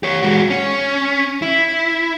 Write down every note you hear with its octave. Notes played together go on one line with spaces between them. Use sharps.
G4 C#5
G#3 F#4
C#4
E4